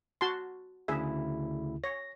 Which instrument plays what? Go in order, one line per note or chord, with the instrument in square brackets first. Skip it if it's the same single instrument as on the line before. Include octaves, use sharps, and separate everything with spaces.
[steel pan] F#4 A5 C6
[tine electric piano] D2 C#3 E4 [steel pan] G#4 E5
[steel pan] C#5 [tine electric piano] A#6